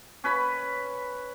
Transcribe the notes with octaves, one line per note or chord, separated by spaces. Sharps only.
C#4 B4 B5